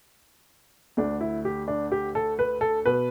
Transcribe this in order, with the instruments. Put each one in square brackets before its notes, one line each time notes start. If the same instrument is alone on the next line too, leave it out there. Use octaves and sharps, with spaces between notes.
[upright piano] D2 D3 D4
E4
G4
D4
G4
A4
B4
A4
B2 B4